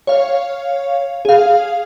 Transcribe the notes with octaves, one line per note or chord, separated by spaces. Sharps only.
C#5 F5
G#4 F5